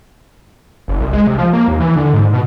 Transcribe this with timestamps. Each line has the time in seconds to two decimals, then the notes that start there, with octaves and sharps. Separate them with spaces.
0.88 F#1
1.00 C2
1.13 G#3
1.27 C3
1.38 F3
1.53 A#3
1.68 D#2
1.80 E3
1.96 D3
2.13 G#2
2.33 B2